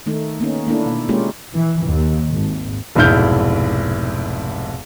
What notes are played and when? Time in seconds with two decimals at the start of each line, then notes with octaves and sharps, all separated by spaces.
0.06 D#3 A3 D#4
0.40 A#3 B3 C#4 D#4
0.67 A3 A#3 D4 E4
0.86 B2 A#3
1.09 G#3 A#3 C#4 F4 G4
1.54 E3
1.87 D#2
2.32 G#1
2.95 F1 B1 G#2 E4 F6 G6